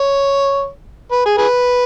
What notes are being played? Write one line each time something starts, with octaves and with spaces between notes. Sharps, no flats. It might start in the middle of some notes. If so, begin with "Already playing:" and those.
Already playing: C#5
B4
G#4
G#4 B4